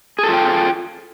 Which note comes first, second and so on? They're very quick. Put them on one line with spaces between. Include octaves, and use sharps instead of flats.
G#4 A4 F4 G5